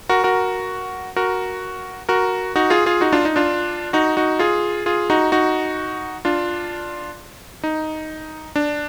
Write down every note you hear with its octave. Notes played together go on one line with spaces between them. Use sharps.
F#4 A#4
F#4 A#4
F#4 A#4
F#4 A#4
D#4 F#4
F4 G#4
F4 G#4
D#4 F#4
D4 F4
D#4
D4 F4
D#4 F#4
D#4 F#4
F4 G#4
F4 G#4
D#4 F#4
D#4 F#4
D4 F4
D#4
D4